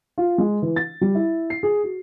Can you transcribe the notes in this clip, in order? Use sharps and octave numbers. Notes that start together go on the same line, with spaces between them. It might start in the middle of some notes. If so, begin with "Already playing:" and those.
F4
G#3
E3
A6
G3
E4
C7
G#4
F#4